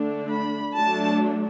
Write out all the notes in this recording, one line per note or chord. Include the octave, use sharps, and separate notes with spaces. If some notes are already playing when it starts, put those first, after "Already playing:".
Already playing: D3 A3 D4
B5
F#3 A3 D4 A5